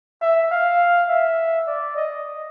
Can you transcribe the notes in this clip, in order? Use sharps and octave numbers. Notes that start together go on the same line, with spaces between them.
E5
F5
E5
D5
D#5